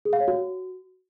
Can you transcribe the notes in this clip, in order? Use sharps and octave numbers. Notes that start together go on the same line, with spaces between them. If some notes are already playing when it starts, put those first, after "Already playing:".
G#4
F5
C#5
F#4